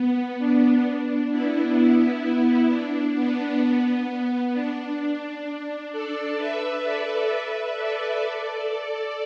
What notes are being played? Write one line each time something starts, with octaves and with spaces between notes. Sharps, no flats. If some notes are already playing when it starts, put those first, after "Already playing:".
Already playing: B3
D4
D4
B3 E4
B3 E4
B3
D4
B3
D4
A4 D5
B4 E5
A4 D5
B4 E5
A4 D5
A4 D5